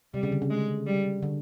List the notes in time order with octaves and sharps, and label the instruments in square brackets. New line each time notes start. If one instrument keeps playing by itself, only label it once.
[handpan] C3 [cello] G3
[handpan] C#3
D3
C#3
[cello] G#3
G3
[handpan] D3